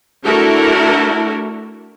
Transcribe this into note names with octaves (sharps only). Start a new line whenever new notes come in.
A3 D4 E4 F#4 A4 A#4